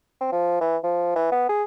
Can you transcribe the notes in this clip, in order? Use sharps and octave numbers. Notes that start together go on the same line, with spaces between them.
C4
F3
E3
F3
E3
B3
G#4